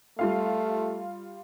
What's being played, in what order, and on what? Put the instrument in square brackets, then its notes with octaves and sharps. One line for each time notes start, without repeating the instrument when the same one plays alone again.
[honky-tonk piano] G3 F4 F5 [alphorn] A3